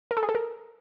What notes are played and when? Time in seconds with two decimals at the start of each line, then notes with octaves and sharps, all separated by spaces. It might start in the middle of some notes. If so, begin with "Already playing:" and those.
0.11 A#4
0.17 A4
0.23 G#4
0.29 A4
0.35 A#4